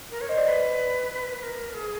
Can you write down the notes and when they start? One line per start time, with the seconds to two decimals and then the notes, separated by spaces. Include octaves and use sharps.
0.11 A#4
0.21 C#5
0.29 C5 D#5
0.38 D5
0.45 B4 D#5
1.38 B4
1.43 A#4
1.73 G#4